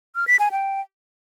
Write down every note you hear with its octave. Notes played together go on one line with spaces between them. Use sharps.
F6
B6
G#5
G5